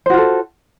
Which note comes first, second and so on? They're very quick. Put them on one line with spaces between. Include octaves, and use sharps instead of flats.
C5 F#4 F4 A4